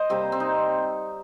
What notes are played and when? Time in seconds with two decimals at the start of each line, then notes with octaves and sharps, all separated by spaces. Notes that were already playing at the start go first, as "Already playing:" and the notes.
Already playing: C5 D#5
0.09 C3 G3 A#3 C4
0.32 C4
0.40 D#4